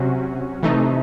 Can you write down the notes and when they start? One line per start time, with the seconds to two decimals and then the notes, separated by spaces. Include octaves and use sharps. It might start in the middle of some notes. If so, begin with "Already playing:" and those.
Already playing: C3 F#3 C#4 F#4
0.62 C3 E3 A3 D#4